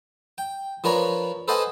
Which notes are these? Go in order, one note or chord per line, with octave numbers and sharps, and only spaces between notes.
G5
F3 D4 A#4 B4 C#5 A#5
A4 B4 C5 D#5 F#5 G#5